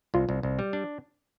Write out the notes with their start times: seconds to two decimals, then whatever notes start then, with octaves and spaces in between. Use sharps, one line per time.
0.14 C2 F4
0.29 C2
0.43 C2
0.59 G3
0.73 D4